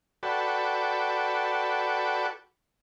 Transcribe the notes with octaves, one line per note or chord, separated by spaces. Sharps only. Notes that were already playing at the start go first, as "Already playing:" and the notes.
F#4 A4 B4 D5 G5